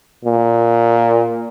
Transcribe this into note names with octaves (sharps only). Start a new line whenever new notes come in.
A#2